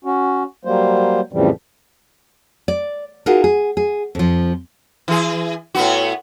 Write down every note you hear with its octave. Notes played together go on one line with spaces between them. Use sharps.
C#4 F#4
F#3 G3 A#3 C5
F2 A2 C#3 E3 F3 G3
D5
D#4 F4 F#4 G#4 A#4
G#4
G#4
F2 F3
E3 G#4
A2 B3 F#4